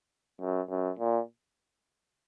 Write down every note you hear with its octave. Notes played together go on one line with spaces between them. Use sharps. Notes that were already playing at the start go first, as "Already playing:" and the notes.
F#2
F#2
A#2